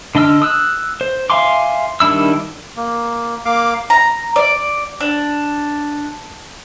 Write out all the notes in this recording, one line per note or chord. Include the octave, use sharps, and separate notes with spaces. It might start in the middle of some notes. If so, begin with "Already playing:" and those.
D3 D4 D#5 E6 F6
D#6 E6 F#6
C5
E5 F5 G#5 C6 D6
D#3 G3 D4 E4 E6
A#3
A#3 F5 D6
A#5
D5
D4